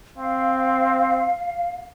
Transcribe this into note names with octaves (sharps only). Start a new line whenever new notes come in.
C4 F5